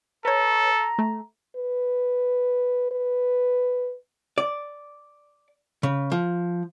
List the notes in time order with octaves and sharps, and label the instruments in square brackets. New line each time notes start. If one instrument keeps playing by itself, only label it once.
[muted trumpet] A4 [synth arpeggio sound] B4 C#5 [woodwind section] A#5
[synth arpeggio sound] A3
[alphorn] B4
B4
[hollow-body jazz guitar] D5
C#3
F3